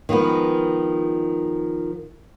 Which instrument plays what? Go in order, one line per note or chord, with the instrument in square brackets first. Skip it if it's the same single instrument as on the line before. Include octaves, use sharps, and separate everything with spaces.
[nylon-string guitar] D#3 F3 G#3 B3